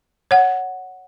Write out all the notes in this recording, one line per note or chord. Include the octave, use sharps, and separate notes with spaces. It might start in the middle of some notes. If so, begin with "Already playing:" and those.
C#5 F#5